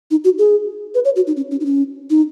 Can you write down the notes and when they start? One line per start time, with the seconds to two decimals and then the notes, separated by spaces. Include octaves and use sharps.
0.11 D#4
0.24 F#4
0.38 G#4
0.95 B4
1.05 C#5
1.16 F#4
1.27 D#4
1.36 C#4
1.51 C#4
1.60 D#4
1.65 C#4
2.10 D#4